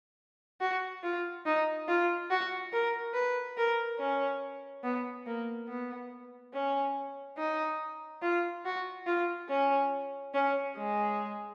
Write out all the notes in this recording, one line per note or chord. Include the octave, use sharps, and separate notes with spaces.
F#4
F4
D#4
F4
F#4
A#4
B4
A#4
C#4
B3
A#3
B3
C#4
D#4
F4
F#4
F4
C#4
C#4
G#3